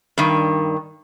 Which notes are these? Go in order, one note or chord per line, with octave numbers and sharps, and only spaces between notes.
G2 D#3